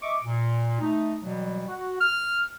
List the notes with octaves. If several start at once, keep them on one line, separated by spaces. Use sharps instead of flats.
D#5 E5 C#6 D6
A#2
A3 D#4
B2 E3 F#3 G3
F#4
F6